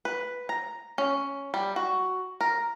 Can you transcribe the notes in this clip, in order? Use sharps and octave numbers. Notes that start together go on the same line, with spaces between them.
B4
A#5
C#4
G3
F#4
A#4